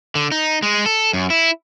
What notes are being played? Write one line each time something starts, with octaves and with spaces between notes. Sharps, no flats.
D3
D#4
G#3
A4
F#2
E4